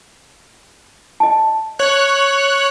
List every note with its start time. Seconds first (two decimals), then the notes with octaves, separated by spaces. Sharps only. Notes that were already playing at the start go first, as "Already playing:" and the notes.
1.20 D#5 A5
1.79 C#5 F#6